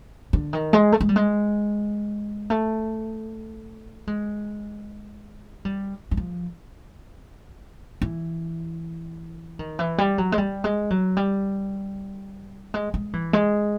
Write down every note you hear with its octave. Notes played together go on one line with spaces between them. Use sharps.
D3
D#3
G#3
A3
G#3
G3
G#3
A3
G#3
G3
F#3
F3
E3
D#3
E3
G3
F#3
G#3
G3
G#3
F#3
G3
G#3
G#3
E3
G#3